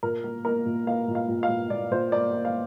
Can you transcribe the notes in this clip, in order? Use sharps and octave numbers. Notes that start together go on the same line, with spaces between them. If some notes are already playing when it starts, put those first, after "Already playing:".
A#2 A#4
A#3
A#3 A#4
A#2
A#3 F5
A#2
F5
A#2
F5
A#2
A#2 D5
A#2 C5
A#3 D5
A#3
F5